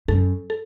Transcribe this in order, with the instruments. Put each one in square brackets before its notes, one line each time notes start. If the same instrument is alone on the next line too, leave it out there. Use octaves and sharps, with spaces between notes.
[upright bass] F#2 [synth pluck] A4
[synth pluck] A4